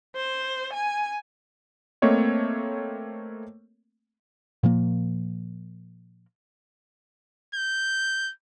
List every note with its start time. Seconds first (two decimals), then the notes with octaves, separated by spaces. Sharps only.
0.16 C5
0.73 G#5
2.02 A3 A#3 C4 C#5 D#5
4.63 A#2 F3 A#3
7.55 G6